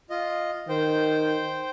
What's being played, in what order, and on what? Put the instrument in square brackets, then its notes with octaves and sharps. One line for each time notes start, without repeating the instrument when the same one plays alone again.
[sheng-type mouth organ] F4 D#5
[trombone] D#3 [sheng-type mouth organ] C5 G5